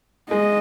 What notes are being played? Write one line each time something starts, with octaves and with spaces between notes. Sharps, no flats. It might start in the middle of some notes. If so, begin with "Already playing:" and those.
G#3 D#5